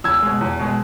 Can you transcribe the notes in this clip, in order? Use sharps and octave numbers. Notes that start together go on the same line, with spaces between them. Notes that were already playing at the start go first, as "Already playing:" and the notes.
E2 E6 G#6
B2 G#3
E2
B2 G#3